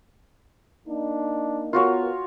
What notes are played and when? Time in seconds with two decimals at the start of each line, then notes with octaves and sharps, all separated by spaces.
0.88 A#3 D4 D#4
1.73 B3 F4 F#4 A#4 C#5